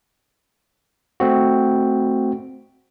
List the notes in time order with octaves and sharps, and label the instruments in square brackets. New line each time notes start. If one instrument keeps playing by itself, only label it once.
[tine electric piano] A3 C4 F#4